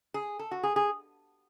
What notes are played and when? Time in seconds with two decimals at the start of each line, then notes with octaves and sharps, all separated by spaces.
0.14 G#4
0.39 A4
0.51 F#4
0.63 G#4
0.76 G#4